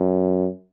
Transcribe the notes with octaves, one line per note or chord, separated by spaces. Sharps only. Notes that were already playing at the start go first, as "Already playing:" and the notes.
Already playing: F#2